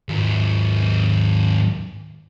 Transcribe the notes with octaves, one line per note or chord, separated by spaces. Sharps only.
D#2 G#2